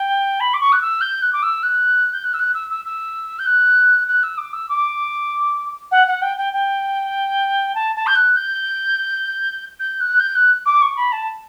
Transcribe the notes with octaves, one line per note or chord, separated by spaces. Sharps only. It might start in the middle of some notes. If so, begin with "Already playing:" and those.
Already playing: G5
B5
D6
C#6
F#6
E6
G6
F#6
D6
E6
F#6
G6
F#6
E6
F#6
E6
E6
E6
G6
F#6
F#6
E6
D6
E6
D6
F#5
F#5
G5
G5
G5
A5
A5
G6
F#6
G6
G6
F#6
G6
F#6
D6
C#6
B5
A5